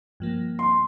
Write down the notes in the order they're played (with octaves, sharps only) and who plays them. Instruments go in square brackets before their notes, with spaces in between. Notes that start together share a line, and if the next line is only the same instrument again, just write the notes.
[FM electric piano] G2 F3 A#3
[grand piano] C6